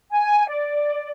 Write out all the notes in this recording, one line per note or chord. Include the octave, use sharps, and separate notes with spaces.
G#5
D5